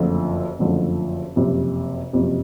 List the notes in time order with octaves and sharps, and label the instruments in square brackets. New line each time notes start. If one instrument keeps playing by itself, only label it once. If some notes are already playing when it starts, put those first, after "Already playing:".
Already playing: [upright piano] F#1 F2 D3 F3 A3
F#1 F2 D3 F3 A3
F#1 F2 C3
F#1 F2 C3